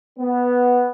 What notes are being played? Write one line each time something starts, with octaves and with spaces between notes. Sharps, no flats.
B3